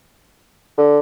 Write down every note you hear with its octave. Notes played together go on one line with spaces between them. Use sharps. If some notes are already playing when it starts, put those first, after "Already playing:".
D3